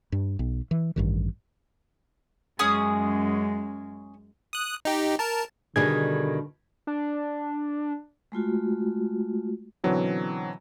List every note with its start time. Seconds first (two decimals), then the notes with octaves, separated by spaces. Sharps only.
0.12 G2
0.39 B1
0.71 E3
0.96 A1 G2 D#3
2.59 F#2 G#3 C#4 G#4 D#6
4.53 D#6 F#6
4.85 D#4 G4
5.19 A#4 A5
5.76 B2 D3 D#3 G3 D4 G#4 G#6
6.87 D4
8.32 G#3 A3 F4 F#4
9.84 B2 D3 E3 F#3 C4 C#4